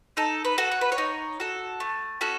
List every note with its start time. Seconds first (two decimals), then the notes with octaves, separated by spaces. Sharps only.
0.17 D#4 A4
0.45 B4
0.58 F#4 A4
0.72 C#5
0.81 B4
0.92 C#5
0.98 D#4
1.40 F#4 A4
1.80 A3
2.21 C#4 F#4 A4